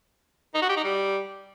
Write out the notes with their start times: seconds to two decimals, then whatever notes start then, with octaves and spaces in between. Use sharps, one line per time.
0.54 D#4
0.62 F#4
0.69 G4
0.77 D#4
0.84 G3